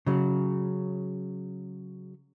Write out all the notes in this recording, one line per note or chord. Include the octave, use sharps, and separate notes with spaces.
C#3 F#3